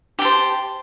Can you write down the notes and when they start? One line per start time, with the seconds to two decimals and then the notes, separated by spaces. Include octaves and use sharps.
0.19 G4
0.22 A5
0.25 C5